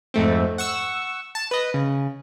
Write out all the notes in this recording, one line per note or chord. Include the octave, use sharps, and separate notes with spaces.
F2 G#2 A3 C4
F#5 C#6 E6
A5
B4 D#5
C#3